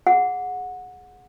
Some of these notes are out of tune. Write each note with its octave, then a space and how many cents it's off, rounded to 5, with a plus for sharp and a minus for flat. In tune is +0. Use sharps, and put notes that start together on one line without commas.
G#4 +0 F#5 -20